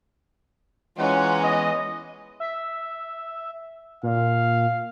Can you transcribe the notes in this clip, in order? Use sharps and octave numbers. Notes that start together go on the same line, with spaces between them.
E3 G#3 C#4 F4 F#5 A#5
B3 D#5
E5
A#2 F5